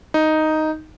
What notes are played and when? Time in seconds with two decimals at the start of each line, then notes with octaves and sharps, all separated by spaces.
0.14 D#4